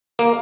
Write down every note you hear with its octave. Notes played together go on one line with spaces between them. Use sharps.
A#3